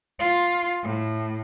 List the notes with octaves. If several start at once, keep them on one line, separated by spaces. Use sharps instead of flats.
F4
A2